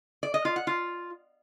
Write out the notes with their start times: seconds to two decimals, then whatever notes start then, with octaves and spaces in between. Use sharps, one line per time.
0.23 D5
0.34 D#5
0.45 F4
0.56 F#5
0.67 F4